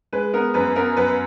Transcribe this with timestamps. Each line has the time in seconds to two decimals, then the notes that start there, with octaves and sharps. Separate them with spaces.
0.13 G#3 B4
0.34 B3 A#4
0.54 F#2 B4
0.76 B3 A#4
0.97 F#2 B4